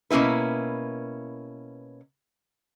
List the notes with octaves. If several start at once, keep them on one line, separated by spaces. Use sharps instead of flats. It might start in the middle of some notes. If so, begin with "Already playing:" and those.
B2 A#3 C#4 E4 B4